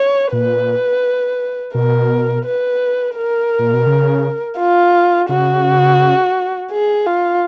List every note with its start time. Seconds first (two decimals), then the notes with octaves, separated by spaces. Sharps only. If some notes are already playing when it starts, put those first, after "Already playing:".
Already playing: C#5
0.32 A#2 B4
1.74 B2 A#4
2.44 B4
3.16 A#4
3.59 A#2
3.73 B2
3.86 C#3
4.58 F4
5.29 C#3 F#4
6.71 G#4
7.06 F4